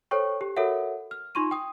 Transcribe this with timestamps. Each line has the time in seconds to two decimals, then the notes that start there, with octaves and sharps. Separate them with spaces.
0.11 A4 C5 C#5 G5 C#6
0.41 G4
0.57 F#4 A4 A#4 C#5 E5 F#5
1.11 F6
1.35 D#4 F4 C6 C#6 D#7
1.51 G5 D#6